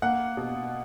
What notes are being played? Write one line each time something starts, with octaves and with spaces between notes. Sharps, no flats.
A#3 F#5
B2